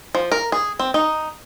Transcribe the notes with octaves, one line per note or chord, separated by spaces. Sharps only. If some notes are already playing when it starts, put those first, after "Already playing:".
F3
A#4
G#4
C4
D#4